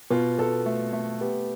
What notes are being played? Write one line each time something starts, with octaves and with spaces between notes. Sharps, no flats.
B2 F4
B2 A4
A3
A3
B3 G4